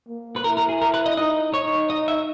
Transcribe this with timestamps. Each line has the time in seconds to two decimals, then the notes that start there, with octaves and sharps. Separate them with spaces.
0.08 A#3
0.36 B4
0.44 E4 A#4
0.57 A#4
0.69 G#4
0.82 A#4
0.94 B4
1.06 D#5
1.17 D#4 D#5
1.53 D#4 C#5
1.90 D#5
2.08 E5